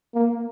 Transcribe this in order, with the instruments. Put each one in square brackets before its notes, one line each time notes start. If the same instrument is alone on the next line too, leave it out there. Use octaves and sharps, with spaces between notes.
[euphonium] A#3